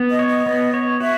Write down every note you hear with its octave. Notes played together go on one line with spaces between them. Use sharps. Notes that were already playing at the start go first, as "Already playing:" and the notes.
Already playing: B3
D#5
C#5
D#5
B3
C#5
F#4 E5